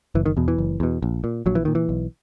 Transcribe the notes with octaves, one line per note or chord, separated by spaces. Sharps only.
F#1 E3
D#3
E2 B2
E3
F#1
E2 B2
A#1
A#2
A#1 F#3
E3
A#2 D#3
E3
B1